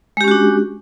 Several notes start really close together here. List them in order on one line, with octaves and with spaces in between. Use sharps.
G#3 G4 C#4 F#4 D4